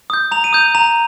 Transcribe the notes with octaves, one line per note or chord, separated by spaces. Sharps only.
D#6 G6
A#5 F7
D#7
D#6 G6 F7
A#5 F7